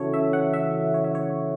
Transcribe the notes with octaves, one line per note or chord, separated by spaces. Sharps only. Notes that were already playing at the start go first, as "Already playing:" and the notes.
Already playing: C#3 E3 C#4 E4 F#4 A4 C#5
E5
F#5
E5
C#5
E5
C#5